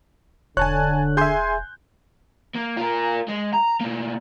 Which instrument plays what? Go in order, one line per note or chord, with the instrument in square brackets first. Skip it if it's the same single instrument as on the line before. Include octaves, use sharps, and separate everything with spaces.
[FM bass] E1 [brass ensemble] D3 [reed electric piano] C#5 [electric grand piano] G#5 A5 F#6
[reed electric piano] G#4 E5 [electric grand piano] G#5 C6 G6
[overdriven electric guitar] A#3
F4 A#4
G#3
A#5
B2 A#3